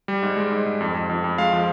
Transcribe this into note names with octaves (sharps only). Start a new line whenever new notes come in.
G3
G#2
G#3
G#2
G#2
F2
F2
F2
F2
G#3 F5
F3